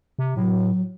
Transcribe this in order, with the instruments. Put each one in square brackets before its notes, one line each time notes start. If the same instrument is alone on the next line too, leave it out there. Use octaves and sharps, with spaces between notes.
[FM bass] C3
[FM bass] A2 [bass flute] F#3